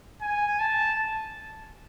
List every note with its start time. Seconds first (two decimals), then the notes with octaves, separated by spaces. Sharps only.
0.22 G#5
0.60 A5